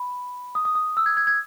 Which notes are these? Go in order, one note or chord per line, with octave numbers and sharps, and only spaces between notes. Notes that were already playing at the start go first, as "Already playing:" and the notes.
Already playing: B5
D#6
D#6
D#6
E6
G#6
G#6
G#6